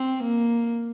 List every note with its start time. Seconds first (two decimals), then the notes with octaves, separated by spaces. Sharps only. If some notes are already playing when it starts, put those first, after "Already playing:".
Already playing: C4
0.23 A#3